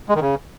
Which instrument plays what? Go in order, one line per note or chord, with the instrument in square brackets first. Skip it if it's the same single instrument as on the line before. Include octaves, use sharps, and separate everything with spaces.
[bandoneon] G#3
D#3
C#3